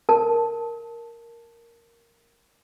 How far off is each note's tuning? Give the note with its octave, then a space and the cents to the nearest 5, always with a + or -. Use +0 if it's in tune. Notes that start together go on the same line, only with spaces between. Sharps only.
A#4 +0 A5 +0